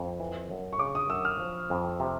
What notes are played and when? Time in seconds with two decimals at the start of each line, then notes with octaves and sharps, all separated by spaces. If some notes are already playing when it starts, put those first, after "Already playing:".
Already playing: F2
0.20 E3
0.50 F#2
0.73 C#6
0.79 C#3 D6
0.95 D#6
1.10 F#2 E6
1.25 F6
1.40 F3
1.70 F2
2.00 C3